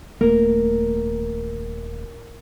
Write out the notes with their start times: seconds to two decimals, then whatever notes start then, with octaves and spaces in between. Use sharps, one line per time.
0.21 D#1 A3 A#3 A#4